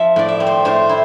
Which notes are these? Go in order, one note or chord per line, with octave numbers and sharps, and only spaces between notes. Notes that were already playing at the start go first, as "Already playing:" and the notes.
Already playing: F3 E5
A2 D5
E5
C4
C5
A2 C5
E4